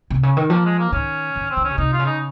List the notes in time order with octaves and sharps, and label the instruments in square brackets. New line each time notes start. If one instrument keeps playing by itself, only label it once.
[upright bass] C3
C#3
D#3
[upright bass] F3 [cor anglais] A#3
[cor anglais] G#3
A#3
[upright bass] D#3 [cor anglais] C#4
[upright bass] D#3
[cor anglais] C4
[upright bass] D#3
[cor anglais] C#4
[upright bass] C#3
[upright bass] C3 [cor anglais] D#4
[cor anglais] F4
[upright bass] C#3
[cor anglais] D#4